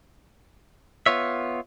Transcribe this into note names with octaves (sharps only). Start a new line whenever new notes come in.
B3 F4 C#5 E5